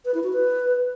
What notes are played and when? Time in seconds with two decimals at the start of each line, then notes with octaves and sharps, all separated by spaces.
0.05 B4
0.14 E4
0.24 F#4
0.33 B4